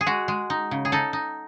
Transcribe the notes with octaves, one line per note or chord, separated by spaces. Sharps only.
G#4
G#3 F#4
G#3
D#4
C#3
G#4
D#4 A4
D#4